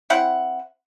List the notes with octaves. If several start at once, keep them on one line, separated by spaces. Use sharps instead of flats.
C4 E4 F#5